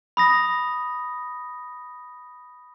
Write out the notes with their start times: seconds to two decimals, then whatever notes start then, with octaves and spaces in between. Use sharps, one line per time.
0.17 B5 D#6 A#6